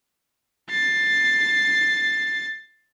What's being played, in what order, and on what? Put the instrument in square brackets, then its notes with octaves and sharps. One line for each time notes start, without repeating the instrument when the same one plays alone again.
[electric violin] A6 C7